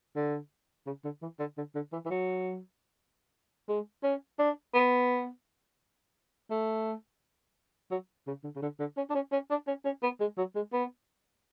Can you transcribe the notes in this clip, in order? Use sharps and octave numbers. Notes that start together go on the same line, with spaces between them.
D3
C#3
D3
E3
D3
D3
D3
E3
E3
F#3
G#3
C#4
D4
B3
A3
F#3
C#3
D3
C#3
D3
D3
C#4
D4
C#4
C#4
D4
C#4
C#4
B3
G#3
F#3
G#3
B3